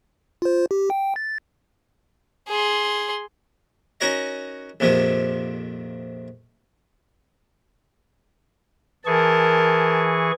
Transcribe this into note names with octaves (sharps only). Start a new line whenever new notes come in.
F4 C5
G4
G5
A6
G#4 C6
C#4 D#4 F#4 A#4 C#5 D#5
A#1 F2 C3 D#3 F3
E3 G#4 A#4 A5 C#6